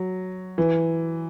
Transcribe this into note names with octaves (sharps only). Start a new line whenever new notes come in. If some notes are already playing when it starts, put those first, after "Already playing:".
Already playing: F#3
E3